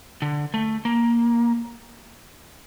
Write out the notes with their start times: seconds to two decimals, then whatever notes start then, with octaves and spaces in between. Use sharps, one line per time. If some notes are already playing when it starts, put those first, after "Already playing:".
0.22 D3
0.54 A3
0.85 A#3